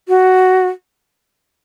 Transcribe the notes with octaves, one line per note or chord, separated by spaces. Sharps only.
F#4